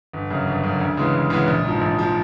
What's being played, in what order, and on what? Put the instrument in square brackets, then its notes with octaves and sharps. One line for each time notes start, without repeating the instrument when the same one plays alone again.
[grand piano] G1
F#2 C#3
G1
F#2 C#3
D2
C#3 E3 G#3 B3
D2
C#3 E3 G#3 B3
A#1
G#2 F3
A#1
F3